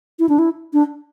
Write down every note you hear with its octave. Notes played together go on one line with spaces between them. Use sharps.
E4
D4
E4
D4